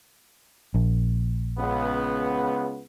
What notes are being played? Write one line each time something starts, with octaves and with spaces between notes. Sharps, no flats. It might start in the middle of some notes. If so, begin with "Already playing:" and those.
A#1
C#2 C#3 B3